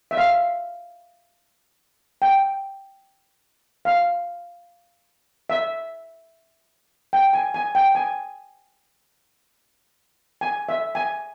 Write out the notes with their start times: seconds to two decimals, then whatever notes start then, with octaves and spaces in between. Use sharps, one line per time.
0.11 E5
0.17 F5
2.22 G5
3.85 F5
5.50 E5
7.13 G5
7.33 G#5
7.54 G#5
7.75 G5
7.95 G#5
10.41 G#5
10.69 E5
10.95 G#5